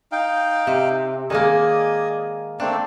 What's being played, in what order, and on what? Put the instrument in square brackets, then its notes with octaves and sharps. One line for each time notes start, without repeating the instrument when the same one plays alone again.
[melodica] D#4 F5 G5
[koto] C3
[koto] D#3 G#3 A#3 [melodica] D5 D#5 G#5
[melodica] A3 A#3 C4 [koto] D4